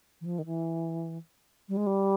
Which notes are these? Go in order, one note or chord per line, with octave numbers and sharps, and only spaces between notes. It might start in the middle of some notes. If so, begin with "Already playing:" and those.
E3
F3
D#3
E3
G3
G#3
G3